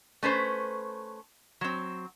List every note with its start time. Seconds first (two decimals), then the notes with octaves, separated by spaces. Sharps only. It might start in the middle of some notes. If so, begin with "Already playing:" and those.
0.23 A3 C#4 B4 C5
1.61 F#3 C4